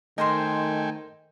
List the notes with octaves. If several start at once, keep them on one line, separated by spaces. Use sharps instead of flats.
D#3 A3 A#4 C5 D#5 G5 G#5 C6